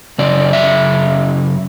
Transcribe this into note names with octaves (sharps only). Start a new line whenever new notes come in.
F#2 C#3 D5
E5